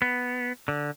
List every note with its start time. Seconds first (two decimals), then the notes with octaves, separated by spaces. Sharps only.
0.02 B3
0.68 D3